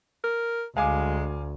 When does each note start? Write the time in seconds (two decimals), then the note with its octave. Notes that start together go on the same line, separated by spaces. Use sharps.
0.24 A#4
0.77 D2 G#3 F5 G#5 D6